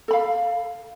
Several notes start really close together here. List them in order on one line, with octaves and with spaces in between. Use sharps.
A4 B5 F5